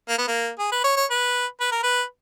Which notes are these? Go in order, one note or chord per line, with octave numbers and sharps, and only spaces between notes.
A#3
B3
A#3
G#4
B4
C#5
C#5
B4
B4
A#4
B4